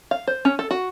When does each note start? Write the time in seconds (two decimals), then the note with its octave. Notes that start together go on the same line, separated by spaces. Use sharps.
0.11 F5
0.27 C5
0.45 C#4
0.59 A4
0.71 F#4